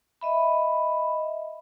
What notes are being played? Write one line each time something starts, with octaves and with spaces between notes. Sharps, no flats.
D#5 E5 B5